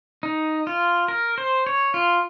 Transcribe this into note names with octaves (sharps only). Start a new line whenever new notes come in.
D#4
F4
A#4
C5
C#5
F4